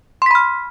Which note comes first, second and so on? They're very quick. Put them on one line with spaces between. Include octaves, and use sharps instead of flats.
C6 B6 B5 F6